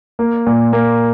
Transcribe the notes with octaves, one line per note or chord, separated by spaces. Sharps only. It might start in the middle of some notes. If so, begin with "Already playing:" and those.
A#3
A#2
A#3